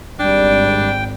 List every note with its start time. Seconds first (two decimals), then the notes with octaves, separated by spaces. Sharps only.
0.19 G#1 G3 D4 G5